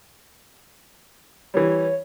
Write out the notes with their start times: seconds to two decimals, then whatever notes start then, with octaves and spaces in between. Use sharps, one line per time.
1.54 E3 G3 C#5